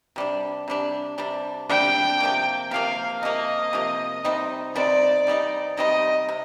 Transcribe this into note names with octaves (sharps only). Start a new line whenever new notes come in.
C3 G3 D4
C3 G3 D4
C3 G3 D4
C3 G3 D4 G5
C3 F3 A#3
C3 F3 A#3 F5
C3 F3 A#3 D#5
C3 F3 A#3
C3 G3 C4 D#4
C3 G3 C4 D#4 D5
C3 G3 C4 D#4
C3 G3 C4 D#4 D#5
C3